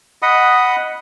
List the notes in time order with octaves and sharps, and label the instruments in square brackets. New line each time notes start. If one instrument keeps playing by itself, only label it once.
[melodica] D#5 F#5 B5 D#6